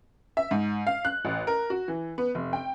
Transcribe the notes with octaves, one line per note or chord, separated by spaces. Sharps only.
E5
G#2
F5
F#6
A1
A#4
F#4
E3
B3
F1
G5